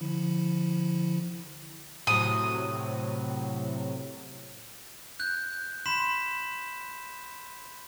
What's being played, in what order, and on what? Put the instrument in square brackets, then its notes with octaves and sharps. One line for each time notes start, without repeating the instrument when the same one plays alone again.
[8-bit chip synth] D3 F3 E4
[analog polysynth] A2 C3 F#3 [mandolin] D#6
[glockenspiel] F#6 G6
B5 C6 B6 E7